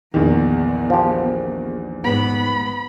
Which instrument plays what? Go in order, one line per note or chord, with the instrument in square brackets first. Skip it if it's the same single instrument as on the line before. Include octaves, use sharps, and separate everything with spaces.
[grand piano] A#1 E2 D#3 [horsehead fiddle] B3
[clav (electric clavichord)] F3 G4
[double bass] G#2 B3 [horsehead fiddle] B5